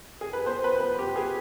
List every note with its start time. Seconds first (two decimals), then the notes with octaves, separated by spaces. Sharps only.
0.21 G#4
0.33 B4
0.46 B3 C5
0.64 B4
0.80 B3 B4
0.99 G4
1.15 B3 G#4